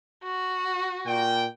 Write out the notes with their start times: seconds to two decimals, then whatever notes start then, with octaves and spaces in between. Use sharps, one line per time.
0.24 F#4
1.06 A#2 G5